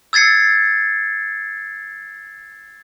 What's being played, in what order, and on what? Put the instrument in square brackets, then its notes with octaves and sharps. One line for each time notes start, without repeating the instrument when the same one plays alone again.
[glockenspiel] E6 G#6 A6 C7 C#7